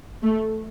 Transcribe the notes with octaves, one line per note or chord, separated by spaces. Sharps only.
A3